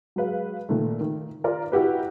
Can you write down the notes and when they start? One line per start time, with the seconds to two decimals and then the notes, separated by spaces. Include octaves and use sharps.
0.16 F#3 G#3 B4 F5
0.69 A#2 D#3 A3
1.01 D#3
1.44 F4 A#4 D5
1.72 E4 F#4 G4 B4